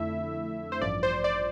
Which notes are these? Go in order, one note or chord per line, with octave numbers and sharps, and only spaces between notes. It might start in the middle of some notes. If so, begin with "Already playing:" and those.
Already playing: F2 D3 A3 E4 E5
C5
A1 G2 F3 D5
C5
D5